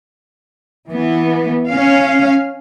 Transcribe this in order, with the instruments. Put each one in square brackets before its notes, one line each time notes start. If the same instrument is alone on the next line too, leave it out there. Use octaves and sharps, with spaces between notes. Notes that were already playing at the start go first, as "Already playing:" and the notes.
[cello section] E3 B3
C#4 F5